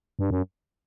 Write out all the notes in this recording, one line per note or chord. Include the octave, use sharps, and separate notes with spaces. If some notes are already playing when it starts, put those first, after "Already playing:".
G2
F#2